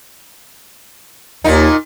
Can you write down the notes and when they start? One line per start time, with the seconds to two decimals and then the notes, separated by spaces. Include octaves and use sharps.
1.44 D#2 A#2 D#4